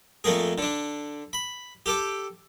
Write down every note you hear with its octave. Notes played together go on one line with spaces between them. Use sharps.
F2 A3 A#3 G#4
D3 D4
B5
G4 A4 D6